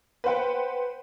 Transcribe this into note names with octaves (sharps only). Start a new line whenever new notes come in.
B4 C5 F#5 G5